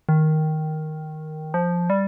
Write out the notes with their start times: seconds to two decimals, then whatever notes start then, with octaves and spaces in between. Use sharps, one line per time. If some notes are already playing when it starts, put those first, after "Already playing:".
0.09 D#3
1.54 F3
1.90 G3